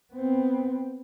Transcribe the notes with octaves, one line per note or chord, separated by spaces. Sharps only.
B3 C4